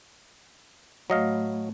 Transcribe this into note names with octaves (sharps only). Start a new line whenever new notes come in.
A2 F#3 D#5 F5